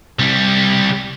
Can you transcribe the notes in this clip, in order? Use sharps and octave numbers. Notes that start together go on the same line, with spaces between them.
C2 G3